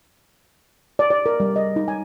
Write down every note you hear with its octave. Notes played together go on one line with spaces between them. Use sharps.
D5
D5
A#4
G3
D#5
D#4
G#5